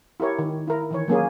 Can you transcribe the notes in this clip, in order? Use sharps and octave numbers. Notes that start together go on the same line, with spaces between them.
E4 G4 A#4 C#5
D#3
E4 A#4
D#3 E3 C#5
F#3 A#3 C#4 G#4